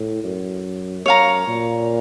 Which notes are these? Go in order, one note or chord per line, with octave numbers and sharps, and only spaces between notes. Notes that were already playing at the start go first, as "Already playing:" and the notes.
Already playing: A2
F#2
F#2 C#5 F5 A#5
A#2